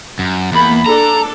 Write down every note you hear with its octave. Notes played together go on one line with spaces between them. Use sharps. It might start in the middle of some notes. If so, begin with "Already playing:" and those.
F#2
E2 A#3 B5
D4 A4 A#5